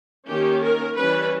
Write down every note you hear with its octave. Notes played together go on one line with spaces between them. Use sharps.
D#3 A#3 C#4 G4
A#4
E3 G3 C#4 B4